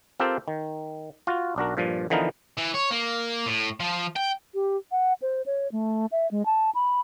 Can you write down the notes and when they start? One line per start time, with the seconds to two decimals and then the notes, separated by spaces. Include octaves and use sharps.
0.20 C4 F4 G4 A4 A#4 C5
0.48 D#3
1.27 F4 F#4
1.56 B1 D4 F#4 A#4
1.77 G2 A#2 F3
2.10 D3 E3 F3 B3 D#4 A#4
2.57 E3
2.74 C#5
2.91 A#3
3.46 A2
3.80 F3
4.16 G5
4.54 G4
4.92 F#5
5.22 C5
5.46 C#5
5.72 A3
6.12 E5
6.31 G#3
6.46 A5
6.75 B5